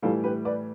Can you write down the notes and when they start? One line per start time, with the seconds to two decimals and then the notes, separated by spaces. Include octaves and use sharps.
0.02 A2 E3 G3 F4 A4
0.24 G4 B4
0.45 B4 D5